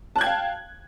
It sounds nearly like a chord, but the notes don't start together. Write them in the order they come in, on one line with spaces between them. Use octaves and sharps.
A5 F#6 G#6 G5 F5